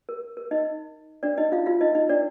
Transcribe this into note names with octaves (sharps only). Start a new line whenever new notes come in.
A#4
A#4
D#4 D#5
D4 D5
D#4 D#5
F4 F5
F4 F5
D#4 D#5
D#4 D#5
D4 D5